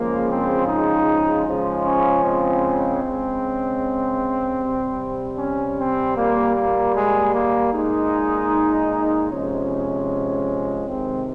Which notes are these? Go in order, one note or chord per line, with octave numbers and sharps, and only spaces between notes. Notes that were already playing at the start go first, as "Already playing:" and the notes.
Already playing: C#3 F3 G#3 A#3
C4
D#4
C#3 F3 G#3
C#4
C4
C#3
G#3
C3 G3
C#4
C4
A#2 G3 A#3
A#3
G#3
A#3
A#2 G#3 D#4
C3 F3 G#3 C#4
C3 D#3 G#3 C4